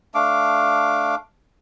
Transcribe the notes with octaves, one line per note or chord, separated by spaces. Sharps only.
A3 D4 F5 D6